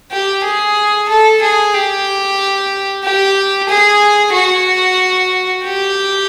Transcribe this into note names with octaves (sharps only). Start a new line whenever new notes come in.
G4
G#4
A4
G#4
G4
G4
G#4
F#4
G4